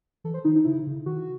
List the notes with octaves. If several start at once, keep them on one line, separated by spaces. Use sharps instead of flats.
E3 A4
C5
D#3 D#4
D#4
C#3 E4
C#3
D#3 F#4